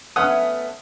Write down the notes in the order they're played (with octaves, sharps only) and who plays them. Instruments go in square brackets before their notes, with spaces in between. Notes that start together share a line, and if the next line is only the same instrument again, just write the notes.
[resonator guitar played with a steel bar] A3 B3 C#4 [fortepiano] F#5 D#6